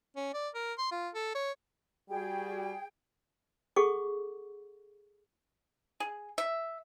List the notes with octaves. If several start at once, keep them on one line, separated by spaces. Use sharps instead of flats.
C#4
D5
A#4
C6
F4
A4
C#5
G3 F#4 G#4 G5
G#4 A4 F#5 C#6 D6
G#4
E5